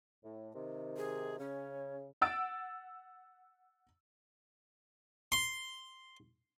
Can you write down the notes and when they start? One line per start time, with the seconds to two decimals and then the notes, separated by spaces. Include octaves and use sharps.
0.23 A2
0.53 C3 D#3
0.97 G#4
1.39 C#3 C#4
2.21 F#5 E6 A6 D7
5.32 C6